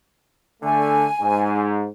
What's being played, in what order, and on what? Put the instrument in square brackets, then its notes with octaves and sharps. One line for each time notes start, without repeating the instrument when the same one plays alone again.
[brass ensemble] D3 A3 [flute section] G#5
[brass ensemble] G#2